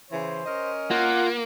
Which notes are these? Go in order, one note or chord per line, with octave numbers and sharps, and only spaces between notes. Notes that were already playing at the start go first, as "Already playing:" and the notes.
C#3 E3 C5
C#4 A#4 D#5
A#3 F4 F#5